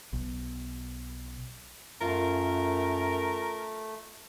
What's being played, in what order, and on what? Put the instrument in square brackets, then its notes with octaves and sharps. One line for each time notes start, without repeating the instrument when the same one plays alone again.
[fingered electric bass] B1
[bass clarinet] F#2 [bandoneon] A3 [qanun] F4 [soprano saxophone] A#4